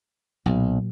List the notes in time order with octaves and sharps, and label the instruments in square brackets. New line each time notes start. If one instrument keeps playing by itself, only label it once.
[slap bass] B1 [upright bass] A#2 F#3